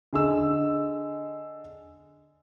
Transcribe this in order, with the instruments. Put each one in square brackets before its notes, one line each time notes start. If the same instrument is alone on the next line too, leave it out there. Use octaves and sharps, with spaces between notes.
[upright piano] D3 G#4 D#5 E6